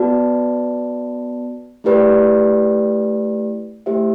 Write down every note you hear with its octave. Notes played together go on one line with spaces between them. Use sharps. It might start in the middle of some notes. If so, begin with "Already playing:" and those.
Already playing: B3 F#4 B4 D5 A5
A3 E4 G4 B4 D5
A3 E4 G4 C5 E5